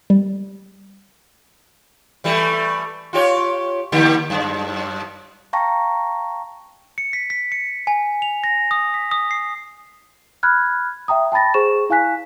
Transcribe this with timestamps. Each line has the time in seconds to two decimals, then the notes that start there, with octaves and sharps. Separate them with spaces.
0.10 G3
2.24 E3 G3 A3
3.13 F4 G4 C#5
3.92 D3 A#3 G4
4.30 F#2
5.53 F5 G5 A5 A#5 C#6 A#6
6.98 C#7
7.13 B6
7.30 B6
7.52 C#7
7.87 G#5
8.22 F7
8.44 A#6
8.71 D#6
8.94 B6
9.11 D#6
9.31 C7
10.43 B5 F6 F#6 G#6
11.08 E5 G5 A#5 D#6
11.32 G5 A5 B5 A6 A#6
11.54 G#4 C5 C#6 E7
11.90 E4 F5 G#5 F#6 B6